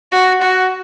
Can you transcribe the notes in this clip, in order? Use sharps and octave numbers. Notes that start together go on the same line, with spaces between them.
F#4
F#4